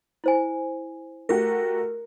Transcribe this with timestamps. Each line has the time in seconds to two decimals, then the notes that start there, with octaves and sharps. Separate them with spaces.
0.24 E4 C5 G#5
1.29 A3 F#4 G4 A#4